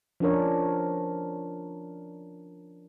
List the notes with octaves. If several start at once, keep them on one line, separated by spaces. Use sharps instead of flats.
F3 C#4 D4 A#4 C#5